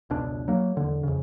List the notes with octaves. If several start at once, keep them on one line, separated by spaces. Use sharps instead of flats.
F1 C#2 B2 D4
F#3 A#3
E1 D3
F2 C#3